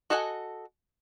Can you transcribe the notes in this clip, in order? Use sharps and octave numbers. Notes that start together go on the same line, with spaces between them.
F#4 A4 D#5 F#5 G#5